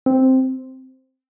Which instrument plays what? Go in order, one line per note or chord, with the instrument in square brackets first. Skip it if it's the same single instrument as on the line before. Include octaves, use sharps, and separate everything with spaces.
[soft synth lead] C4